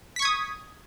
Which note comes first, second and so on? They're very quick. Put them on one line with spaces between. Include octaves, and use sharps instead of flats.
B6 C#6 G#6 D#6